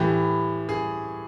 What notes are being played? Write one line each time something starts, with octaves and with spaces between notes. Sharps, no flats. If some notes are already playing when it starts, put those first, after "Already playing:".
Already playing: A2 E3 G4
G#4